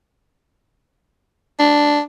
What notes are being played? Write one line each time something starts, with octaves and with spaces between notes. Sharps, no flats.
D4